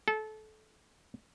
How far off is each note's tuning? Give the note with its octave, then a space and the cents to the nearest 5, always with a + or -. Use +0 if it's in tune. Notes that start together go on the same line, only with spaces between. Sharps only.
A4 -25